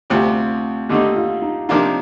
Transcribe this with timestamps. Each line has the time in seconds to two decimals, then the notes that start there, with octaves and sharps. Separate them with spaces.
0.10 D2 C3 G3 F4
0.89 D#2 D3 A3 D#4 G4
1.16 F4
1.42 D#4
1.69 C3 F3 A#3 D4 D#4 F4